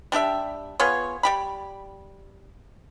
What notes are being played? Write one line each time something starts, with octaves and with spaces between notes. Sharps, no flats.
G3 D4 G4 E5
B3 F4 G#4 C#5
G3 G4 B5